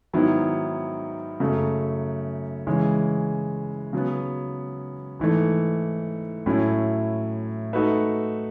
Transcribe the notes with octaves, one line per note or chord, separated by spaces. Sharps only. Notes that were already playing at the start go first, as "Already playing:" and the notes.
G#2 D#3 F#3 B3 E4
F#2 C#3 F#3 A3
C#3 E3 G#3 C#4
C#3 F#3 B3
G#2 E3 A3
A2 F#3 C#4 E4
A3 D#4 F#4 B4 E5